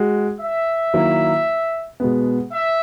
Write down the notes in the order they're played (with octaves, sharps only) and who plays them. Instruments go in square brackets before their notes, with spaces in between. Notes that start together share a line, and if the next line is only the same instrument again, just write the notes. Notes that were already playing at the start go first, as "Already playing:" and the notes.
Already playing: [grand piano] G#3 F#4
[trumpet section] E5
[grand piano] D#3 F#3 A#3 E4
B2 G#3 B3
[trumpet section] E5